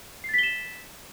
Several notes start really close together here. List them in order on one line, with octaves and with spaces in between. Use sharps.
C7 A6 B6 G7 E7